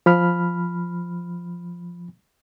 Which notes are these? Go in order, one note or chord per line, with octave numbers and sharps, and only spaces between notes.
F3 B5 F6